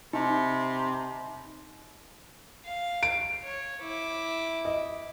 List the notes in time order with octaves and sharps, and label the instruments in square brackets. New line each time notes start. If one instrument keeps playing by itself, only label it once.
[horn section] C3 B5 C6 [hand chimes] D#4
[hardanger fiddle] F5
[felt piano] D7
[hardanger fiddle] C#5
E4 D6
[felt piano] D#5